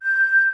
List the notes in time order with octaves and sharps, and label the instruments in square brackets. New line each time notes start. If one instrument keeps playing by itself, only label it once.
[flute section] G6